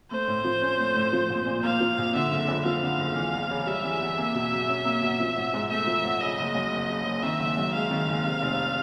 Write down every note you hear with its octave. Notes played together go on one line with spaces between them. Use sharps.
A3 C5
A2
F3
C#4
A3
A2
F3
A#1
A#2
A#3 F5
F3
A#1
D3 E5
F#1
F2
F3 F5
D3
F#1
E3
E2
C#3
G3 E5
E3
E2
A#3
B2
F#3
C#4
A#3
B2
F3
A1
G#2
A3 E5
F3
A1
C#3 D#5
F#1
F#2
F#1
C#3
F#1
D#3 E5
F#1
F#2
G#3 F5
D#3
F#1
C3
F1